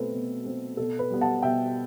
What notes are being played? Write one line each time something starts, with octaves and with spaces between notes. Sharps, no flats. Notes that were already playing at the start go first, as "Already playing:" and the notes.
Already playing: B2 A3 C4 A4 B4
B2
A3 C4
B2 A4
B4
G3 B3
F#5 A5
B2 E5 G5